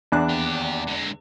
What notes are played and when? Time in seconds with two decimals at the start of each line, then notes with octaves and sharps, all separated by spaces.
0.12 E2 D4 F#6
0.29 D#2 G4
0.88 D3 G#3